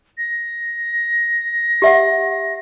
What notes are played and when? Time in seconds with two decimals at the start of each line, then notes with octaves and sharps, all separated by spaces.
0.18 A#6
1.82 G4 E5 F#5